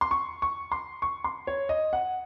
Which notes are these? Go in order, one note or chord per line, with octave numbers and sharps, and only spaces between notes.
C6
C#6
C#6
C6
C#6
C6
C#5
D#5
F#5